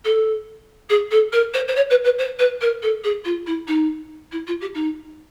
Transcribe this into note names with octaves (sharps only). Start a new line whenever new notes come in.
A4
G#4
A4
A#4
C5
C5
C#5
B4
B4
C5
B4
A#4
A4
G#4
F4
E4
D#4
E4
F4
G4
D#4